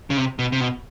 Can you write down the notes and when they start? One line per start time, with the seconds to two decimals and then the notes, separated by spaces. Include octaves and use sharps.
0.10 C#3
0.17 C3
0.39 B2
0.52 C3
0.61 B2